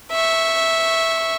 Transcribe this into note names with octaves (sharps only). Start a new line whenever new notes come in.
E5 C#6